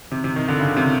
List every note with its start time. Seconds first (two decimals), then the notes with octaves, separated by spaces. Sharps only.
0.12 C3
0.24 C3
0.36 D#3
0.48 D3
0.60 C#3
0.77 C3